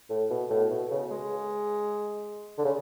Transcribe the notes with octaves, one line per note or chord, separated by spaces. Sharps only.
A2
B2
A2
B2
C#3
G#3
D3
C#3